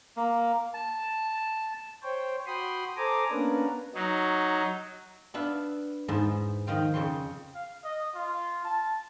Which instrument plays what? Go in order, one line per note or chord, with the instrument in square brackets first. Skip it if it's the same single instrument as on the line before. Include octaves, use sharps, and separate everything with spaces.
[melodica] A#3
A5
[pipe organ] C5 C#5 G5
F#4 G5 B5 C6 D#6
A4 C5 G#5 A#5 D6 D#6
A#3 B3 C#4 D4 A#4 B4
F#3 D#4
[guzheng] B3 D4 B4 E5 F5
E2 G#2 B3 C5 A5
D#3 F3 F4 G5
F2 C#3 C#5 G5 C6
[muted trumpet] F5
D#5
F4
A5